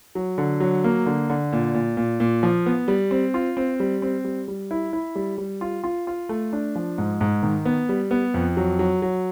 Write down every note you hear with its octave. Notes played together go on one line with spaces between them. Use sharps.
F#3
D3
F#3
A#3
D3
D3
A#2
A#2
A#2
A#2
F3
B3
G3
C4
F4
C4
G3
C4
G3
G3
E4
E4
G3
G3
F4
F4
F4
A3
D4
F3
G#2
G#2
D#3
B3
G3
B3
F2
F#3
F#3
F#3